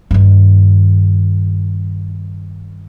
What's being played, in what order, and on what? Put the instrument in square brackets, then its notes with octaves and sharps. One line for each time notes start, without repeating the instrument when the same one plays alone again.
[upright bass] G2 D#3